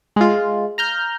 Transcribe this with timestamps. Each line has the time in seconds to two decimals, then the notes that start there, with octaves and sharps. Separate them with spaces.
0.16 G#3 F4
0.78 A#5 F6 G6